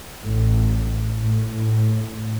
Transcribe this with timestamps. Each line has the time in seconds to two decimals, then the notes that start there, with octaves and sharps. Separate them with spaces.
0.24 A1 A2
1.19 A2